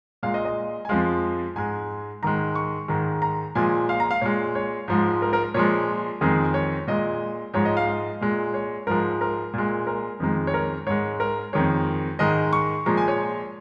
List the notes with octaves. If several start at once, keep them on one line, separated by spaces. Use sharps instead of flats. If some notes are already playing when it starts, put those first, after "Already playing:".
A#2 G#3 F5
D#5
D#5
G#5
F2 F3 G#3 F5
G#2 G#3 G#5
G#2 D#3 G#3 A#5
C#6
G#2 D#3 G#3
A#5
A#2 F3 G#3 G#5
F5
A#5
F5
A#2 G#3 C#5
C#5
G#2 F3 G#3
A#4
A#4
A#2 F3 G#3 C#5
F2 D#3 G#3 G#4
C#5
A#2 G#3 D#5
G#2 F3 G#3 C#5
D#5
F5
D#5
A#2 G#3
C#5
G#2 F3 G#3 A#4
A#4
A#2 G#3
A#4
F2 D#3 G#3
C#5
A#4
G#2 G#3 C#5
A#4
F2 D#3 G#3 C#5
G#2 D#3 G#3 D#5
C#6
A#2 F3 G#3 A#5
G#5
C#5